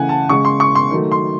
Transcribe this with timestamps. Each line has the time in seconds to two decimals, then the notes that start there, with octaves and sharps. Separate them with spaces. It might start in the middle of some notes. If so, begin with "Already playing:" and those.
Already playing: C#3 E3 A3 F#5 G#5
0.09 A5
0.29 C#3 G#3 C#6
0.45 C6
0.60 C#6
0.75 C6
0.91 D#3 F#3 A3
1.12 C6